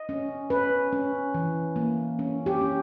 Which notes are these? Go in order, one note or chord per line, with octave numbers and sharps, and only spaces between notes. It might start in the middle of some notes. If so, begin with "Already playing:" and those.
Already playing: D#5
C#4
C#4 B4
C#4
E3
A#3
C#4
G4
C#4